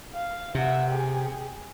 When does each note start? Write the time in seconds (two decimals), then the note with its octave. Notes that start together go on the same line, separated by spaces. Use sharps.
0.14 F5
0.55 C3 E5 F#5
0.90 G4 G#4